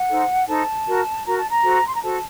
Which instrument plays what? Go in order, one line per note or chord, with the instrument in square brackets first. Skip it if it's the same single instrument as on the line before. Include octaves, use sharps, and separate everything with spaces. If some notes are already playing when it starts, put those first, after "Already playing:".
Already playing: [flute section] F#5
D#4 A4 C5
D#4 A4 C5 A5
F#4 A#4
F#4 A#4 A#5
A5
A#5
F#4 A4 C5
C6
A#5
F#4 A4 C5 A5